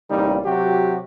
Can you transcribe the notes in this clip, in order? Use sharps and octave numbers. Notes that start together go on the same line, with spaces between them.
A1 C3 G3 A#3 D#4
C3 F#3 F#4 G4